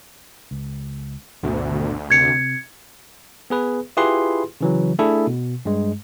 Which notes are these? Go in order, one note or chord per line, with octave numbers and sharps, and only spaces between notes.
C#2
G#1 D2 B2
C3 G#6 C#7
B3 G#4 B4
E4 F4 G4 G#4 B4 C6
C#3 E3 F#3
A3 D4 E4 G#4 A4
B2
G2 G#3